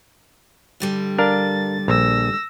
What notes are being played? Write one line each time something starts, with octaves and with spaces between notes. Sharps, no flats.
G2 D3 G3
D4 A#4 F5 A6
A#1 E6 A#6